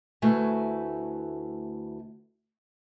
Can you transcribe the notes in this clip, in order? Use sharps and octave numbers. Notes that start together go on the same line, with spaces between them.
D2 A3 E4 F#4 B4 G#5